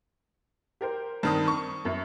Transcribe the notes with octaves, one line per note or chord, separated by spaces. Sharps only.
G4 A#4 C5
G2 D#3 C4 D#6
C#6
F#2 E5